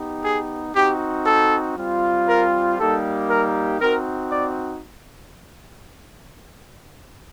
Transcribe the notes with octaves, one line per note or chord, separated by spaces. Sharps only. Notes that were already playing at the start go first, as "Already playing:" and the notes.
Already playing: B3 D#4 G4
G#4
C4 D#4 F#4 G4
A4
G3 C4 F4
A#4
G3 A#3 D#4 G4 A4
A#4
C4 D#4 F#4 A#4
D5